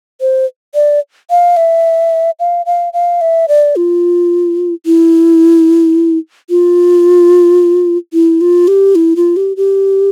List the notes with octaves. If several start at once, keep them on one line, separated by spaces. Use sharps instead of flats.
C5
D5
F5
E5
F5
F5
F5
E5
D5
F4
E4
F4
E4
F4
G4
E4
F4
G4
G4